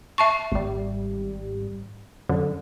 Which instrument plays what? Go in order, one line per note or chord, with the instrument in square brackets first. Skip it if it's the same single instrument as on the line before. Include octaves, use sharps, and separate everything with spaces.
[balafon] E5 A5 C#6
[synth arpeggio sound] G#1 G3
F#2 D3 F#3